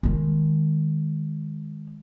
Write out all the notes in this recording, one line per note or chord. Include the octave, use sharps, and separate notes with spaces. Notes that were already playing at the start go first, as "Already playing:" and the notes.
D#3 G#3